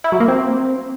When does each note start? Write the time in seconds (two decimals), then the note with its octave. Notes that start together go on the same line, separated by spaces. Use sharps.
0.04 E4
0.12 F#3
0.20 A#3
0.28 C4